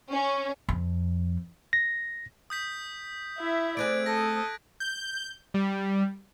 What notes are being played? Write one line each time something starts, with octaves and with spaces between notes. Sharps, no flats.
C#4
F2
A#6
D#6 G6 B6
E4 E5
A3 C4 G#4 D5 F#6 G#6 D7
A4 D#6 A#6
G6
G3